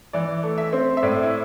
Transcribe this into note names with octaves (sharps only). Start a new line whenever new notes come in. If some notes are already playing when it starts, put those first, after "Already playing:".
E3 D5
A3
E5
C4
E5
A2 D5
E4